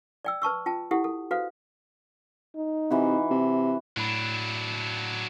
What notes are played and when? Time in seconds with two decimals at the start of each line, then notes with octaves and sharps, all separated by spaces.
0.25 D5 G5 E6
0.42 B4 A5 C#6 E6
0.66 F4 G5 A5
0.91 E4 G4 A4 F#5
1.04 A4
1.31 F#4 A4 B4 C5 F5
2.56 D#4
2.90 C3 E3 F#4
3.30 C3
3.97 A2 F#3 D4 B5